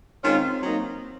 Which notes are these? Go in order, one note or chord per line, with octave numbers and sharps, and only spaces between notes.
D#3 G#3 C4 C#4 F4
F#3 A#3 D#4